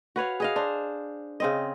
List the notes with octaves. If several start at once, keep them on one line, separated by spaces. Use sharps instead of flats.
F#4 B4 C#5 F5
G#4 D#5 F5
D4 C5
C#3 C4 D#5